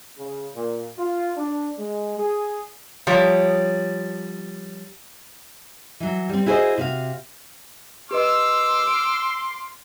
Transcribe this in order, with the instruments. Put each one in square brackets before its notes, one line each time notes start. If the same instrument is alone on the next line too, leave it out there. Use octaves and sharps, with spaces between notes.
[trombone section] C#3
A#2
F4
D4
G#3
G#4
[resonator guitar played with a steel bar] F3 G3 C#5
[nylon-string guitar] E3 F#3
G3 C4
E4 F#4 G#4 A4 C5 D#5
C3 F#4 F5
[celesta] G4 B4 D#5 [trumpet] C6 [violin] D6 F6 [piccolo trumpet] E6
[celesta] D7